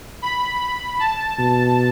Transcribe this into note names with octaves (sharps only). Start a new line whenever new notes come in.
B5
B5
A5
B2